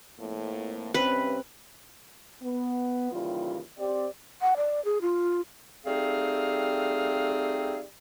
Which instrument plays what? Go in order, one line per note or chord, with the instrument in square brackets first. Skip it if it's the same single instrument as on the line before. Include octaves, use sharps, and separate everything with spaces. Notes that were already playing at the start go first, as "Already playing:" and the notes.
[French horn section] F2 A2 A#3
[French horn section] G2 C3 C#4 [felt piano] C4 [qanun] B4
[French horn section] B3
D#2 C#3 E3 G3 F4
C4 G4 D5
[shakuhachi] F#5
D5
G#4
F4
[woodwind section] G3 A3 C4 D#4 G#4 F5